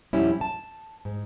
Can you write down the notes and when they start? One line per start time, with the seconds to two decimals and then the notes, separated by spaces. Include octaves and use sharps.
0.13 F2 B2 G3 C#4 E4
0.41 A5
1.05 G#2